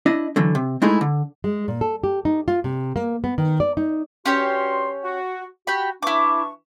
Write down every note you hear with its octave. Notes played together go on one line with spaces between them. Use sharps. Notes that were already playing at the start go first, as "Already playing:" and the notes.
D4 E4 D#5
D3 E3 F#3
C3
G#3 A3 D#4 E4 G#4
D3
G#3
A#2
A4
G4
D#4
F4
C3
A#3
B3
D#3
D5
D#4
G2 C#4 F#4 G4 C#5 C6
F#4
F#4 G4 B5
E3 D4 E4 C#6 D6